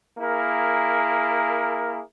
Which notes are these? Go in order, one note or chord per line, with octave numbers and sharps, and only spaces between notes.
A#3 E4 G#4 A#4